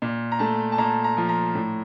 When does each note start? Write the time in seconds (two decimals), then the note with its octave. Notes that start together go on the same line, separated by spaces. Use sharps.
0.02 A#2
0.32 A#5
0.39 A3 A5
0.72 A5
0.78 A#2 A#5
1.04 A#5
1.17 F3
1.29 A#5
1.55 A2